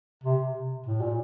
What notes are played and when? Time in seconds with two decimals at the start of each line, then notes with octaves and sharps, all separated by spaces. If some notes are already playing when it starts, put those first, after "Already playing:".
0.24 C3
0.86 A2
1.01 A#2